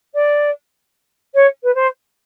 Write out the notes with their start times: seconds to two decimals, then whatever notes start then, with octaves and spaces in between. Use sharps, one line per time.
0.14 D5
1.34 C#5
1.63 B4
1.74 C5